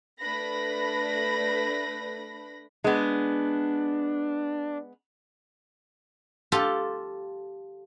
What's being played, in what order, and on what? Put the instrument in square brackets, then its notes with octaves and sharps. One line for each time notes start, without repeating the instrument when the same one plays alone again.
[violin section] A3 D4 B4 B5 A#6
[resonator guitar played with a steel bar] G#3 B3 [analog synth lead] D4
[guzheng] F4 G4 A4